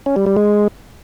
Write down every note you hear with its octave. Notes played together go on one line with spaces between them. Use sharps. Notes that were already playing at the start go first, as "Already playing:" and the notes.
C#4
G3
G3
G#3